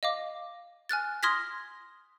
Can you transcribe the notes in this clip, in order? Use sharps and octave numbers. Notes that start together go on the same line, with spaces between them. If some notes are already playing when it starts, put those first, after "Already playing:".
D#5 F5 D6
G#5 F6 F#6 A6
C6 D#6 F6 G#6 A#6 B6